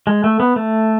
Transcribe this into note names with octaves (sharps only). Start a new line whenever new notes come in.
G#3
A3
B3
A3